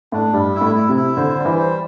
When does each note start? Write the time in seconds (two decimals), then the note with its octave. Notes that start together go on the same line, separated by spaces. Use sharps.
0.12 A2 D4
0.33 G2 G3
0.55 E4
0.61 A2
0.75 E4
0.89 C3
0.96 E4
1.17 D3 C5
1.38 G3
1.45 E3
1.59 C5